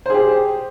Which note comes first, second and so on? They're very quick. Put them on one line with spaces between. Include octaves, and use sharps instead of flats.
C5 G#4 G4